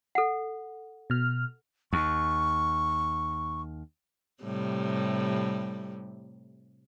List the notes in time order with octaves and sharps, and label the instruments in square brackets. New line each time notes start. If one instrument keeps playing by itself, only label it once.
[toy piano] A4 F#5
[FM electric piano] B2 F6
[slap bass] D#2 [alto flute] C#6
[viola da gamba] A2 C3 G3